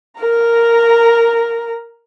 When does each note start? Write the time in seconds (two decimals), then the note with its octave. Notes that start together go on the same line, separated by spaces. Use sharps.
0.20 A#4 A#5